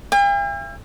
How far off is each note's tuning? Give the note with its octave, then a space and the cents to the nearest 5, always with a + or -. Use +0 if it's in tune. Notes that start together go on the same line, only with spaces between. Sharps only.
E5 +40 G5 +45